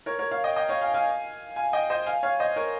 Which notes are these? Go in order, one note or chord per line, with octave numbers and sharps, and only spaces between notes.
A#4 C#5
A#4 C#5
C#5 F5
D#5 G5
D#5 G5
C#5 F5
F5 G#5
F5 G#5
F5 G#5
D#5 G5
C5 D#5
F5 G#5
C#5 F5
C5 D#5
A#4 C#5